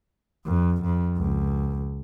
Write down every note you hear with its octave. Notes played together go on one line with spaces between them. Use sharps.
F2
F2
C#2